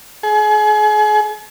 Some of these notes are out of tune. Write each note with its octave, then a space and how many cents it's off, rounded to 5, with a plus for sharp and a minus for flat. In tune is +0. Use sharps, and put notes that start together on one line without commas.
G#4 +35